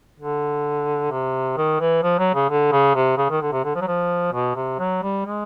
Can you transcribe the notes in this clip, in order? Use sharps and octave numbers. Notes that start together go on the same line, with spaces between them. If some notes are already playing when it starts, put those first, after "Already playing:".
D3
C3
D#3
E3
F3
F#3
C#3
D3
C#3
C3
C#3
D#3
D3
C3
D3
F3
F#3
F3
B2
C3
F#3
G3
G#3